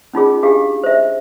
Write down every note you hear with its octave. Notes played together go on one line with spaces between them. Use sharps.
C#4 D#4 F4 G#4
D4 G4 G#4 F5
C5 E5